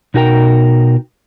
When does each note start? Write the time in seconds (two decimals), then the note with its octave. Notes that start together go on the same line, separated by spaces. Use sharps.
0.14 B2 D#4 F#4 A#4 G5 A#5